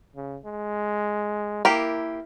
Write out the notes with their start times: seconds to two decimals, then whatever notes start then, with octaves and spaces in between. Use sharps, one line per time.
0.16 C#3
0.46 G#3
1.65 A#3 E4 G4 A#4